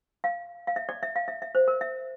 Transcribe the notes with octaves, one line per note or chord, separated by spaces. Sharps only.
F5
F5
E5
D5
E5
F5
E5
E5
C5
A#4
E5